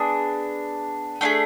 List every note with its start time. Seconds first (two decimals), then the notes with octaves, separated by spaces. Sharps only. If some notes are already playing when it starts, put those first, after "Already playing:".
Already playing: B3 D4 G#4
1.21 A3 D4 F4 G#4